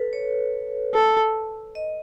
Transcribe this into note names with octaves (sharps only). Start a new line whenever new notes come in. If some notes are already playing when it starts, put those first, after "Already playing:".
Already playing: A4 B4
C#5
A4
D#5